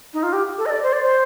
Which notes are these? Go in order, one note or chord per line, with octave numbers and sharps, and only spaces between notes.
D#4
F4
G4
A4
D#5
D5
C5
D5
C5